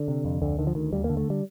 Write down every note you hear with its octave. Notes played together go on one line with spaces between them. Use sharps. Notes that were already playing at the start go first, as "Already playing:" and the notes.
Already playing: D3
C3
F2
D2 D3
D3 D#3
F3
D2 D#3
D#2 G3
A#3
D3
A3
G3